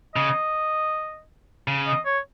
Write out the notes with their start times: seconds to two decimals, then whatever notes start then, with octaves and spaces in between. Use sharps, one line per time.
0.15 C#3 D#5
1.68 C#3
1.87 D#5
2.05 C#5